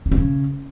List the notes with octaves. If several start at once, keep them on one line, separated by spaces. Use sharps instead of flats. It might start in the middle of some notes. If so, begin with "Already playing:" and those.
D#3
D3
C#3